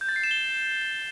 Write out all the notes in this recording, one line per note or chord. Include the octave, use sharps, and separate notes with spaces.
G6
A6
C7
E7
G7